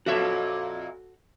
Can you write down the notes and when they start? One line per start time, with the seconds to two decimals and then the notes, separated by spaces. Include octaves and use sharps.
0.06 F2 A#2 F#4 A4 C#5 E5